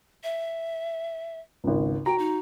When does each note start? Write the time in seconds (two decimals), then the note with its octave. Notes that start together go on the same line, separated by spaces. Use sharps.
0.24 E5
1.64 G#1 C#2
2.06 F#4 G5 A#5
2.19 D#4